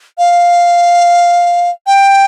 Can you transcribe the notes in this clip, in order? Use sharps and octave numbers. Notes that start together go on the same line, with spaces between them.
F5
G5